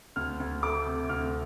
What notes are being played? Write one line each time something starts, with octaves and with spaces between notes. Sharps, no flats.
D2 F6
D2
A3 D6
C3
D2 F6